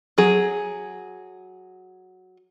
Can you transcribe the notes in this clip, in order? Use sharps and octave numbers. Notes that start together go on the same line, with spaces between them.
F#3 G#4